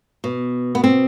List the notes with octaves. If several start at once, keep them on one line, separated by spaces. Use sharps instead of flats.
B2
B3
C4